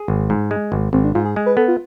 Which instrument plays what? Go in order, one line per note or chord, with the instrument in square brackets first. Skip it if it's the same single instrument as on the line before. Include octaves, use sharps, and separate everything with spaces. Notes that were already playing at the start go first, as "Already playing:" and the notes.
Already playing: [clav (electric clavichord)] G#4
G#1
G#2
G#3
G#1
[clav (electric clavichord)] G#1 [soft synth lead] C4
[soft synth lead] D4
[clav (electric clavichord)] G#2 [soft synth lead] F4
[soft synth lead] G#4
[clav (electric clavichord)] G#3 [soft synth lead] G#4
[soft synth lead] B4
[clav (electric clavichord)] B3 [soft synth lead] A4
[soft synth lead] F4